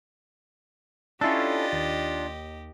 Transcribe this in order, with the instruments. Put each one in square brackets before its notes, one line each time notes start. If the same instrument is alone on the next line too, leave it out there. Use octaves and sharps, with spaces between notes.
[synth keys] C#4 E4 A4 [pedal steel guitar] D4 F4 [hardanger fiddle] G4 D#5
[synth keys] D#2